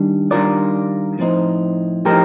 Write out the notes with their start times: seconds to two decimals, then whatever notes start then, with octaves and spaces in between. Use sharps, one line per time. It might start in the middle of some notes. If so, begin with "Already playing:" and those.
Already playing: D#3 G3 D4
0.31 D#3 G3 D4 F4 A#4 D5
1.19 A2 F3 C4 D#4
2.05 A2 F3 C4 D#4 G4 A#4